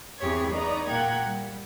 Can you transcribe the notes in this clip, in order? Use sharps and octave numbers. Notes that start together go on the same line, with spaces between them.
E2 C4 G4 G#4 C#5 G#6
B3 D#4 C#5 D5 A#5
A#2 A#3 F#5 G5 A#5 G#6
G3